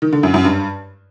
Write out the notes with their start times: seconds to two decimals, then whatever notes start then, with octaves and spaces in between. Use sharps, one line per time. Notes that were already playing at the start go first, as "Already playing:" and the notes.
0.02 D#3
0.13 D3
0.23 F#2
0.34 F#2
0.45 G2